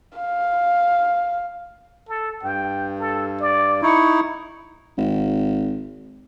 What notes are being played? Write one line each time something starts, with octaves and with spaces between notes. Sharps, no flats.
F5
A4
G2 G5
A4
D5
D#4 E4 C#6
G#1